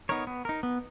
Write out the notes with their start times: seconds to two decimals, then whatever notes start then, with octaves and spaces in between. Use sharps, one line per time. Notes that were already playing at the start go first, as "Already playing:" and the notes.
0.09 B3 D#4 A#4 C#5
0.27 B3
0.45 D#4 A#4
0.63 B3